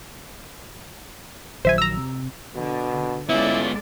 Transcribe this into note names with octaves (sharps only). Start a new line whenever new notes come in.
A#1 D#3 F#3 C5 E5 G#5
A#5 E6
C3
B2 D3
G#3 B3 C#4 E4 F4 A4 D5